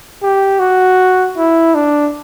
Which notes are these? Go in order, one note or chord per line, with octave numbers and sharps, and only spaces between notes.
G4
F#4
E4
D4